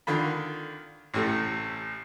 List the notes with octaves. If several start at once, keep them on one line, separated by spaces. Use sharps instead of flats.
D3 D#3 F4 B5
A1 A2 C3 A3